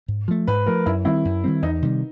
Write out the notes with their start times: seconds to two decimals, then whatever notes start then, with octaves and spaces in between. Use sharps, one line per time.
0.08 G#2
0.28 F3 A3
0.47 G#2 B4
0.66 F3 A3 A#4
0.86 F#2 E4
1.05 D#3 G3 C4 E4
1.25 F#2
1.44 D#3 G3 C4
1.62 E2 D#4
1.82 C3 D#3 G3